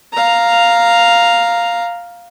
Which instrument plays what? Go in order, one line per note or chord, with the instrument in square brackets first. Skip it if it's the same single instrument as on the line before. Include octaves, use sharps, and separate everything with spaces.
[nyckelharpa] F5 A#5